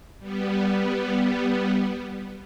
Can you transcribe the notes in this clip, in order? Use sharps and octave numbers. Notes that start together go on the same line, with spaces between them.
G3 B3